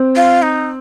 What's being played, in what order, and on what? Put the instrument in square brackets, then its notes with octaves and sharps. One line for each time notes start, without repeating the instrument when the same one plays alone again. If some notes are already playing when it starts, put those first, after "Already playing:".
Already playing: [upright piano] C4
[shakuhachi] F4
D#4